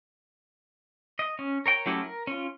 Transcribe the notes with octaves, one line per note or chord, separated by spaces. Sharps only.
D#5
C#4
A#4 C#5 G5
F#3 A3 C#4 E4 G4
A#4
C#4 F4